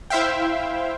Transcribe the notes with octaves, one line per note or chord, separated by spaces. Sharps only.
E4 C5 E5 F5 G5